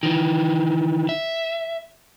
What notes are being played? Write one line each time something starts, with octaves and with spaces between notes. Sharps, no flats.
D#3 E3
E5